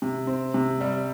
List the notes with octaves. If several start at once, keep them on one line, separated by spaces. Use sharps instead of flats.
C3
C4
C3
G3